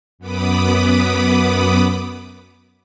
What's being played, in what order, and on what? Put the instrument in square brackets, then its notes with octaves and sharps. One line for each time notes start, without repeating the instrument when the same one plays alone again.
[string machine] F#2 B3 B5 D6 D#6